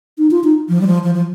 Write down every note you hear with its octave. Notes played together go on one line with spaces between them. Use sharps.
D#4
F4
D#4
F3
G3
F3
F3
F3